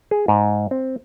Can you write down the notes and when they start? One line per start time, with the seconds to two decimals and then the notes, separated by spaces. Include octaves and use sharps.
0.11 G#4
0.28 G#2
0.71 C4